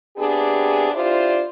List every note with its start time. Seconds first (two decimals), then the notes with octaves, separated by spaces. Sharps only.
0.17 C3 B3 D4 G4 G#4
0.92 D4 E4 F4 G4 C5 D5